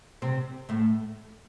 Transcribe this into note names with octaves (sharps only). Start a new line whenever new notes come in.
C3 C4
A2 A3